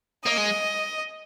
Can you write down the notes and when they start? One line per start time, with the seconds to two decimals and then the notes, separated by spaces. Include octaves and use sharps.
0.25 A#3 D#5
0.37 G#3